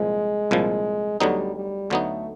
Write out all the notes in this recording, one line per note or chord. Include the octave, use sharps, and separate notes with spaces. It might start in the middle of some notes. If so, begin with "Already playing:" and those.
Already playing: C2 A#2 F3 G#3
C2 A#2 F3
D2 D3 F#3 G3 B3 D#4
G3
D2 D3 F#3 A3 B3 D#4